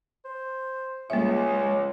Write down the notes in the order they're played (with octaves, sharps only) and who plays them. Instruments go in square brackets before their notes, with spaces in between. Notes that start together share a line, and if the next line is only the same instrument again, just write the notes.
[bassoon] C5
[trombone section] C#2 [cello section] G3 G#3 [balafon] A#3 E5 [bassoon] C#4